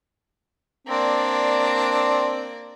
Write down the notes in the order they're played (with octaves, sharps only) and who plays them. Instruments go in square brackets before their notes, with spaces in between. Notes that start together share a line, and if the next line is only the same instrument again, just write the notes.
[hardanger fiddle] A#3 D5 [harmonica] C4 D4